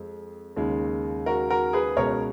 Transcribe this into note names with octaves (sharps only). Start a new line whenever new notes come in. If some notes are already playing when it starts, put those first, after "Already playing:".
Already playing: F2 G#3
D#2 C#3 G#3
F#4 A#4
F#4 A#4
G#4 B4
C#2 B2 G#3 A#4 C#5